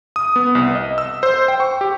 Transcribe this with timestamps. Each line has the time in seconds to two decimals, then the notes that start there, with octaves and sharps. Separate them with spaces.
0.16 D#6
0.36 B3
0.55 C2
0.75 D#5
0.98 E6
1.23 C5
1.48 G5
1.60 C#6
1.81 G4